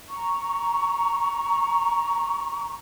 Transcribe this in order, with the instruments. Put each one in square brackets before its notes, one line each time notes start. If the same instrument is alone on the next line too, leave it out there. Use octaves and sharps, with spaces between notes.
[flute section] A#5 C#6